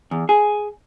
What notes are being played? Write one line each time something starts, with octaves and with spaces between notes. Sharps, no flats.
E2
G#4